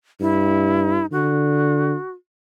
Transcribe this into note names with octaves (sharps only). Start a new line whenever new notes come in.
G2 E4
D3 F#4